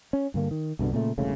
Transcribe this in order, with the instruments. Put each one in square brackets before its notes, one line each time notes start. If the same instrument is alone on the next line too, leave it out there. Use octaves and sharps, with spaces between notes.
[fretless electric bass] C#4
G2 D3 A#3
D#3
C2 G2 B2 D3
A#2 C#3 A3
E1 C2 C#3 A3